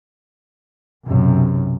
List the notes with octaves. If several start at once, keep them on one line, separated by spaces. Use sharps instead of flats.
B1 F#2 C3